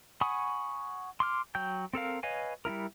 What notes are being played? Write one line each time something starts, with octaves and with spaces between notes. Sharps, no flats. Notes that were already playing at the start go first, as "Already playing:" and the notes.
F#5 G#5 B5 C#6 D#6
C6 D6 F6
F#3 G5 G6
C4 A4 A#4 F5
B4 C#5 D#5 F5 G#5
G3 D#4 E4 A#4